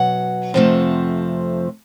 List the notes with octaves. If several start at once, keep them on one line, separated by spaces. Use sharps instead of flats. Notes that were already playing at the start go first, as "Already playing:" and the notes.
Already playing: B2 F#3 F#5
F2 C3 F3 A3